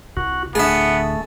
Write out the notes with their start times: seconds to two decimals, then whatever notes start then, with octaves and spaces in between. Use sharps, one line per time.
0.17 C2 F#4
0.55 D1 D2 A3 B3 D4 G#4 E5